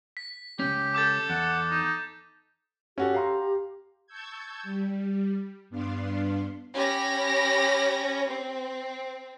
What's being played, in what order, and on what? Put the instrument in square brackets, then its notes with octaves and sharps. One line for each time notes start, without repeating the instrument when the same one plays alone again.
[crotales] B6
[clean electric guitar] C#2 F#2 C#4 [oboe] G4
[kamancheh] A4 [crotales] D6 G6 A6
[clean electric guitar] E2 [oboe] F#5
[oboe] D#4
[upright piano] C#4 F#4 A4 [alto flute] G4
[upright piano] F5 A#5 C6
[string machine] A5 C#6 E6 G6 G#6
G3
G2 B3 D4 F5 C6
[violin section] C#4 G4 B5 A#6
C4